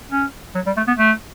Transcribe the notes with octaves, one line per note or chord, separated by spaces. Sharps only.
C#4
F#3
G3
A3
B3
A3